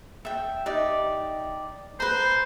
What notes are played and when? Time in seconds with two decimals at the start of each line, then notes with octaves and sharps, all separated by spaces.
0.25 E5 G5
0.66 D#4 G4 D5
2.00 B4 C5 A#5